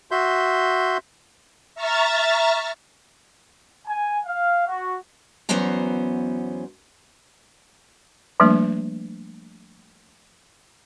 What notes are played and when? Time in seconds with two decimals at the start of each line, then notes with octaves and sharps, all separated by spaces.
0.11 F#4 E5 C6 G6
1.75 E5 A#5 C#6 F6 A6
3.86 G#5
4.25 F5
4.67 F#4
5.49 E2 F#3 B3 C#4 C5 A#5
8.40 F3 G3 A3 A#3 D4